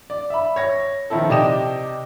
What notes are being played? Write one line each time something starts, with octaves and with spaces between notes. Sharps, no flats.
D5
E5 B5
C#5 A#6
D#3 F3 E4 A4
C3 D5 D#5 G5 E7